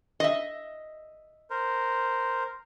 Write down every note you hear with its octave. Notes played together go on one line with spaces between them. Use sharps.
D#5 E5
A#4 C5